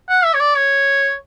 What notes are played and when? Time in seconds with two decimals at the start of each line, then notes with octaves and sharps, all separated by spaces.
0.09 F#5
0.25 E5
0.34 C#5
0.40 D5
0.57 C#5